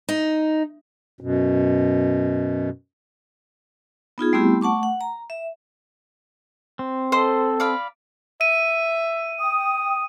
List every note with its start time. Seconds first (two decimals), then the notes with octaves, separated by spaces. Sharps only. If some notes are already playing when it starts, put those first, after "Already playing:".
0.09 D#4
1.21 F#2 B2
4.18 B3 D#4 F4 G#4
4.33 G3 A3 B3 C4 E4 G4
4.61 A3 F#5 A5 C#6 D6
4.83 F#5
5.01 A#5
5.30 E5
6.79 C4
7.12 A4 C5 D#5 C6
7.60 D5 F5 B5
8.41 E5 D#7
9.39 G5 D#6